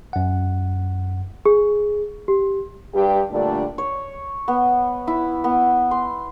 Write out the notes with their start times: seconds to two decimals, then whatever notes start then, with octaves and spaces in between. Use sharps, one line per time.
0.13 F#2 F#5
1.46 G#4
2.28 G4
2.94 G2 G4
3.31 A#2 D3 G3 A3 D4 D5
3.78 C#5
4.48 B3
5.07 E4
5.44 B3
5.91 C6